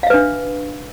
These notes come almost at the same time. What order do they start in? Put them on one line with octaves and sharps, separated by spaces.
F5 E5 B4 D4